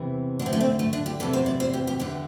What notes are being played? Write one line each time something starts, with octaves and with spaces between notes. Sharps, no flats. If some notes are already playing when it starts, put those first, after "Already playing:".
Already playing: E2 C3 E3
D2 D3 C4 D4
A3
C4
A3
D4
G4
E2 C3 E3 A4
C5
D5
C5
G4
G4
E2 D3 G4